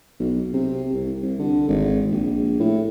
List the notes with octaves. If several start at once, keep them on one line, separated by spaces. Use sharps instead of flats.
B1
C3
C2
C2
D3
G#1
A#1
A2